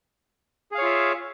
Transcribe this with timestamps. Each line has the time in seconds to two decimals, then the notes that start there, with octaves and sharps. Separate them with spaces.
0.72 G#4
0.75 F5
0.78 C#5
0.82 F4
0.85 E5